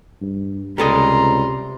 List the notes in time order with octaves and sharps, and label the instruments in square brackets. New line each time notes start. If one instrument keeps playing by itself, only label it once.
[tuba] G2
[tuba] C#2 [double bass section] C3 [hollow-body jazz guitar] G3 A4 D#5 [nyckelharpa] A#5 C6